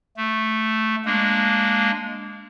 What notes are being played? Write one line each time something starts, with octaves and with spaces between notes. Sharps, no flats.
A3
G#3 A#3 D4